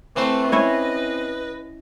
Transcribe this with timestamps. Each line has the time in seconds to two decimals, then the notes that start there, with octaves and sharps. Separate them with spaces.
0.16 E3 A3 C4 B4 C5
0.52 C#4 E4 C#5 D#5